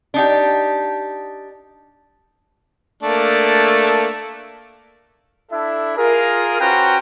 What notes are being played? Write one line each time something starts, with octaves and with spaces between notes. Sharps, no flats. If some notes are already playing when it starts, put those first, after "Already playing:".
D4 D#4 G4
A3 A#3 D4
D4 E4 A4 E5
F4 G#4 A#4
C#4 F#4 B4 C5 G5 A#5